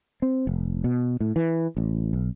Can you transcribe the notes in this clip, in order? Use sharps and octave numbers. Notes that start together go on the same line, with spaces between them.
C4
F1
B2
A2
E3
A1
B1